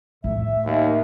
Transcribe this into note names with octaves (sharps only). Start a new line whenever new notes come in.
A2 E5
D#2